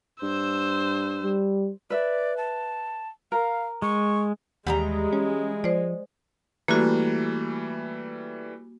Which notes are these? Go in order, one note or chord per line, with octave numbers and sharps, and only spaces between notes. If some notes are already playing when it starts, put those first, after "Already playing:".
G2 C5 E6
G3
B4 D5 E5
A5
A#4 F5
G#3 C#6
D#2 E3 G3 G#3 G4 F#5 A#5
C#4
F3 C5 D5
E3 G3 A3 A#3 F#4